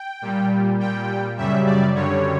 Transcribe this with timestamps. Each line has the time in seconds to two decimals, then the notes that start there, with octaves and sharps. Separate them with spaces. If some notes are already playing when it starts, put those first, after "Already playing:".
Already playing: G5
0.22 A#2 G3
0.79 A#2 G3 G5
1.37 F#2 C#3 G3 E5
1.66 D5
1.95 F#2 D3 G3 C#5